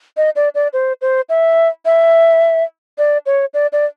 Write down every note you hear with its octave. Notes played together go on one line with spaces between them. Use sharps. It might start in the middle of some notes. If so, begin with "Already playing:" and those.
D#5
D5
D5
C5
C5
E5
E5
D5
C#5
D5
D5